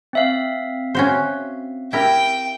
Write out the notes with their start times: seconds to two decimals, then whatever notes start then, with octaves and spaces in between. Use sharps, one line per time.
0.13 C4 E5 F5
0.95 C#4 F#4 C5
1.93 E4 G4 A#4 G5